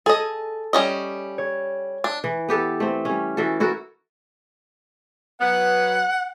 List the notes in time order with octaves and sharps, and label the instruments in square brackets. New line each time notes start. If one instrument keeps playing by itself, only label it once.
[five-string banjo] G#4 D#5 [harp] A4
[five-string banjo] G3 C#4 D#5
[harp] C#5
[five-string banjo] D4
[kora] E3
B3 G4 A4 B4
A3 C4
G3 C#4
E3 F#4 A4
E4 F#4 A4 A#4
[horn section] F#3 B3 [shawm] F#5